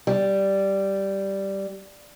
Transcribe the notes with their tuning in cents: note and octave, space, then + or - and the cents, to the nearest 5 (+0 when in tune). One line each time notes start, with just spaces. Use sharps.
G3 -5